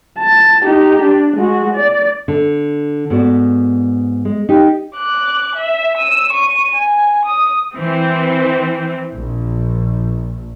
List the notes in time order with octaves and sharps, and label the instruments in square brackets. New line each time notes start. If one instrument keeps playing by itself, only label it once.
[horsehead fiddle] A5
D#4 G4
D4
G#3 F#4
D5
[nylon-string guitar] D3
G#2 B3 F#4 D5
G#3
D#4 G4
[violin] D6 F#6
E5
E6 D#7
C#6 D#7
G#5
D#6
[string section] E3 C4
A#1